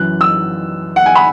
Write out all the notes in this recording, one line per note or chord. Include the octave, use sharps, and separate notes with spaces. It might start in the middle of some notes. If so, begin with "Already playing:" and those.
Already playing: F#2 E3 F#6
E6
F#5
G#5
B5